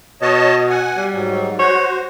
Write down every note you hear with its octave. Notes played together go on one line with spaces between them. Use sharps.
B2 C#5 D#5 A5
F#5 G#5
G3
G#2 F#3
F#4 C5 C#5